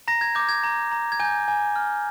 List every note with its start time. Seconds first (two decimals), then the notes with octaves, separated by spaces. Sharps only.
0.08 A#5 A#6
0.21 G#6
0.35 D6 G6
0.49 G#6
0.63 A#5
0.92 A#5
1.12 G#6
1.20 G#5 G6
1.48 G#5
1.76 F6